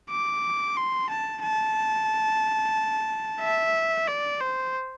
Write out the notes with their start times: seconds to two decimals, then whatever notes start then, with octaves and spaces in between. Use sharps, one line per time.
0.10 D6
0.77 C6
1.09 A5
1.43 A5
3.41 E5
4.08 D5
4.41 C5